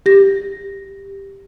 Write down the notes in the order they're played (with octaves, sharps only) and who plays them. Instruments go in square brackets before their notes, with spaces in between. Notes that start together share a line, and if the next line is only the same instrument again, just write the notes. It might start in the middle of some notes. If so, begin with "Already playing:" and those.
[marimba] G4 A#6